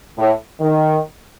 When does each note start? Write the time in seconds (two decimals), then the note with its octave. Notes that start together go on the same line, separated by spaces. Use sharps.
0.18 A2
0.60 D#3